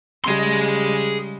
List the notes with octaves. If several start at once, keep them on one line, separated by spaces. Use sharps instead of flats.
C#3 G3 G#3 G#4 C6